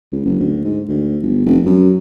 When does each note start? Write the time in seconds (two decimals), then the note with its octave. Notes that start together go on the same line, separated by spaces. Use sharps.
0.12 C#2
0.25 F#1
0.40 D2
0.65 G#2
0.89 D2
1.23 G1
1.46 F1
1.66 F#2